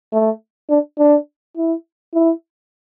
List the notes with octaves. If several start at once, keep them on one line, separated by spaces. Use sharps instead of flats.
A3
D4
D4
E4
E4